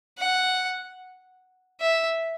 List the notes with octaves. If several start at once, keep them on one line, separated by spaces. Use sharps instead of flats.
F#5
E5